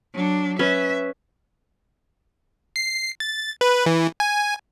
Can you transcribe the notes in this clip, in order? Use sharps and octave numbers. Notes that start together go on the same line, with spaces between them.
F#3 D4
C#4 B4 E5
C7
A6
B4
E3
G#5